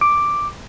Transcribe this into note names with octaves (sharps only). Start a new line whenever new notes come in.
D6